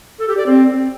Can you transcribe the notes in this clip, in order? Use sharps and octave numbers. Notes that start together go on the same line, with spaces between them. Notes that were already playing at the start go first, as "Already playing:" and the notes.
A4
G4
D5
C4